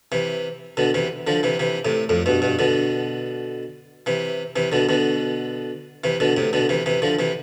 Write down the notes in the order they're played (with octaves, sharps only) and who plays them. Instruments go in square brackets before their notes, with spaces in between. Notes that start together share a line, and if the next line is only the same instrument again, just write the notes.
[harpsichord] C3 E3
B2 D3
C3 E3
D3 F3
C3 E3
C3 E3
A2 C3
F2 A2
G2 B2
G2 B2
B2 D3
C3 E3
C3 E3
B2 D3
B2 D3
C3 E3
B2 D3
A2 C3
B2 D3
C3 E3
C3 E3
D3 F3
C3 E3